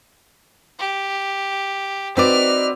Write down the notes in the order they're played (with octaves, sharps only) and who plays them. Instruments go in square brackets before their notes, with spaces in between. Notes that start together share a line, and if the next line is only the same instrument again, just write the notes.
[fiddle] G4
[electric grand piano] C4 B4 D6 [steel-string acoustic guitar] D#4 F#4 D5 [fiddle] F6